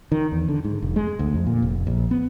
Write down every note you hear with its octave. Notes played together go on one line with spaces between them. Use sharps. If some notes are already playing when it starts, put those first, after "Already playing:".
D#3
E2
D3
G#2
F1
G#3
D2
F2
A#2
F1
A#1
B3